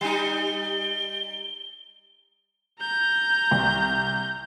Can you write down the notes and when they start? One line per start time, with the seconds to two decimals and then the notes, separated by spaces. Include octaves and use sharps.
0.01 G3 D#4 G7
2.80 A#5 G6
3.51 C2